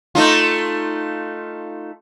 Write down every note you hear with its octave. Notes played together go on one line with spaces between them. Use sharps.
A3 D#4 F4